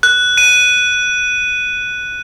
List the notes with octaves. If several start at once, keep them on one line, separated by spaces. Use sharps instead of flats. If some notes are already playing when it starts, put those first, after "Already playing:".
F#6
D#7